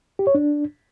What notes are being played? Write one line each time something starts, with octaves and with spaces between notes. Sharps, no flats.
G4
C#5
D4